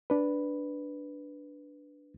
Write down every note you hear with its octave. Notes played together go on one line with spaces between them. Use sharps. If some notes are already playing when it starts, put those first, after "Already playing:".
D4 B4